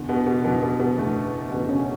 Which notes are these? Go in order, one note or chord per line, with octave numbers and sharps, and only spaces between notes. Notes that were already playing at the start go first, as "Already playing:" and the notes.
Already playing: F#1 E2 D3
B2 B3
B2 B3
F#1 E2 B2 D3 B3
B2 B3
B2 B3
F#1 E2 D3 A3
F#1 E2 B2 D3 B3
C#3 C#4